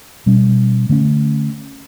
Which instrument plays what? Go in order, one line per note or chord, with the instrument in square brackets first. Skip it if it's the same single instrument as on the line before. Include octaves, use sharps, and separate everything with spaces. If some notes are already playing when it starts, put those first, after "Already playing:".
[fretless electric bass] B2 G3 C#4
D3 A3 C#4